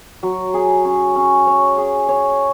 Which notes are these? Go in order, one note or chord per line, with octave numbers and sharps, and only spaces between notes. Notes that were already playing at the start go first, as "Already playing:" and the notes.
F#3
G#4
C#4
C#4
C#5
G#4
C#5